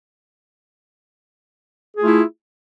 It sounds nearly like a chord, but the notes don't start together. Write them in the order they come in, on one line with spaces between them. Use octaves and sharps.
G#4 A3 F4 E4